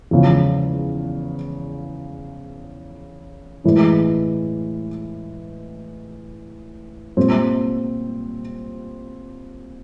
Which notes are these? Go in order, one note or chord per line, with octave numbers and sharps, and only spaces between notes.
E2 C#3 F3
A2 E3 G#3
A#2 G3 C4